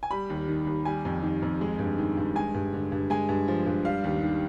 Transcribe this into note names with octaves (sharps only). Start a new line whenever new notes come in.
G#5
G3 B5
D#2
D#3
D#2
G3 G#5
F2
D#3
F2
G#3
G2
D#3
G2
G#3 G#5
G2
D3
G2
G#3 G#5
G2
F3
G2
G3 F5
D#2
D#3